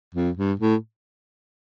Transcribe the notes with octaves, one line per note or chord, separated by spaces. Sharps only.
F2
G2
A2